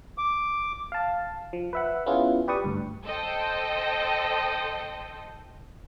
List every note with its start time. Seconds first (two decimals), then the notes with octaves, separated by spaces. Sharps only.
0.18 D6
0.92 F5 A5
1.53 F3
1.73 B4 E5 F#5
2.06 B3 C#4 E4 F4 G#4
2.48 G4 B4 D5 C#6 D#6
2.64 D2 G2
3.04 A4 C5 D#5 G5